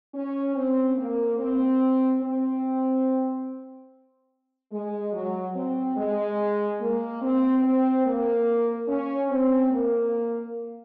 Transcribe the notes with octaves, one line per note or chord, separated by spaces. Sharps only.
C#4
C4
A#3
C4
C4
G#3
F#3
C4
G#3
A#3
C4
C4
A#3
C#4
C4
A#3